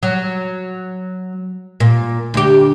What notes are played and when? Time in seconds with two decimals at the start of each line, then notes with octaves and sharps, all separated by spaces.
0.03 F#3
1.80 A#2
2.34 D2 G4